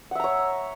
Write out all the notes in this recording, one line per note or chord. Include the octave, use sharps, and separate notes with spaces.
C#5 E5 F#5 A#5